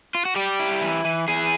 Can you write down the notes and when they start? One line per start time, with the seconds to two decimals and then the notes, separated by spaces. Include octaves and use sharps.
0.15 F4
0.25 F#4
0.36 G3 G4
0.59 E4
0.81 E3
1.05 E3
1.28 E3 G#4